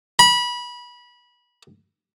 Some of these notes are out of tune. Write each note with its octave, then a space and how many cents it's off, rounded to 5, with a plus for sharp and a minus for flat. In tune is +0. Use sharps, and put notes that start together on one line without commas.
B5 -25